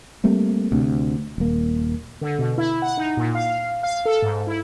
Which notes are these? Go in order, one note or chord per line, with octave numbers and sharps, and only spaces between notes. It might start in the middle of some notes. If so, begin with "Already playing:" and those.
G3 A3 A#3 C4
D2 C3
D#1 A#3
D3
B2
E4
F#5
D#4
A#2
F5
F5
A4
G#2
E4